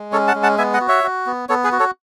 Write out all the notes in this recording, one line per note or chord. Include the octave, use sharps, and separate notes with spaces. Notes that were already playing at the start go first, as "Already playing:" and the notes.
Already playing: G#3
C#4 A4 C#5
F#5 A5
G#3
F#5 A5
B3 E5 G#5
D#5 F#5
F#4
C#5 E5
F#4
B3
B3 A4 C#5
G#4 B4
F#4
A4 C#5